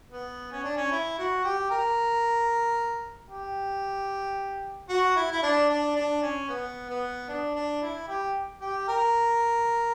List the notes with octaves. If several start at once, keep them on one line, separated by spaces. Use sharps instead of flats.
B3
C#4
D4
C#4
E4
F#4
G4
A#4
G4
F#4
E4
E4
D4
D4
D4
C#4
B3
B3
D4
D4
E4
G4
G4
A#4